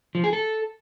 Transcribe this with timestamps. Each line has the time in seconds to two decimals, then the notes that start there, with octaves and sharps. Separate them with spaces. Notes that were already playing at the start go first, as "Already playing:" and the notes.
0.15 F3
0.24 G#4
0.33 A4